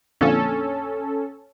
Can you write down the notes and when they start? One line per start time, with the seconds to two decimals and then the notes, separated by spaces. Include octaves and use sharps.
0.21 F2 A#2 D3 C#4 A4